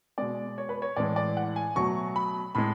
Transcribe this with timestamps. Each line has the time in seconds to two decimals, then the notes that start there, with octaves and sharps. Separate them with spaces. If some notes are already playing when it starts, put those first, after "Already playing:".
0.18 B2 G#3 D5
0.58 C#5
0.69 B4
0.82 C#5
0.97 A2 E3 G#3 D5
1.16 D5
1.37 F#5
1.56 G#5
1.75 B2 F#3 A3 C#6
2.16 B5
2.55 A2 G#3 B5